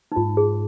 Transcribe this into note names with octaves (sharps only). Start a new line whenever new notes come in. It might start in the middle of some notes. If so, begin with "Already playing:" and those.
D#4
G#2 F4
G#4